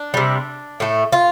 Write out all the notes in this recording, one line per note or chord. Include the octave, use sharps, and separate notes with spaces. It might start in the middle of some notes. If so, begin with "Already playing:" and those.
Already playing: D4
C3 G3
A2 A3
F4